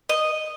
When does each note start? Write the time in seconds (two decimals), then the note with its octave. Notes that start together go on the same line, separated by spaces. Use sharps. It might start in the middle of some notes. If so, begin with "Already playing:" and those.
0.09 D#5